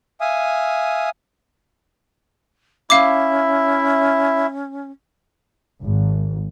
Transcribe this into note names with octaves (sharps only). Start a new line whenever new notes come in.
E5 F5 G#5 D#6
C#4 E4 E5 F5 D6
G#1